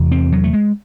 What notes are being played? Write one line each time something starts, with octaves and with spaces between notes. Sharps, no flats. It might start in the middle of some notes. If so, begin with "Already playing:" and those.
Already playing: E2 C3
C4
F#3
A3
G#3